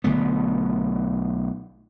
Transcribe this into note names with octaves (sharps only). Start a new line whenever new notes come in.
B1 D3 A3 B3